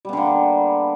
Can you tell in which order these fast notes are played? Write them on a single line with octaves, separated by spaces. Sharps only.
G3 B3 D3 A#3